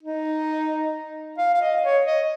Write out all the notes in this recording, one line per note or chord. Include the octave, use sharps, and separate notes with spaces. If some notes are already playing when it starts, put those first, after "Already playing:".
D#4
F5
F5
D#5
C#5
D#5